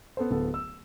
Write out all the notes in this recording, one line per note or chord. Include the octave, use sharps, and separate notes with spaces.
B3 A4 C5
D1 B3 A4
E6